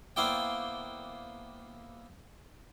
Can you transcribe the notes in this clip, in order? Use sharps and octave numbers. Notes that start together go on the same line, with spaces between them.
A#3 B3 E4 C5 D5 G5